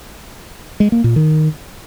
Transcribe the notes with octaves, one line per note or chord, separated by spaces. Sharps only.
G#3
A#3
A#2
D#3